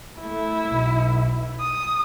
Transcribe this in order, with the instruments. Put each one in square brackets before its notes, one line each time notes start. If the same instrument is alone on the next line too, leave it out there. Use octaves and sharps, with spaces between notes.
[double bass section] A3 [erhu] E4
[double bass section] B1
[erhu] D#6